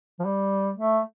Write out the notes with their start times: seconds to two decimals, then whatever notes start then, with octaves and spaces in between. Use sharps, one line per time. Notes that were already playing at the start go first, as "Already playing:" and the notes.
0.20 F3
0.25 G3
0.77 A3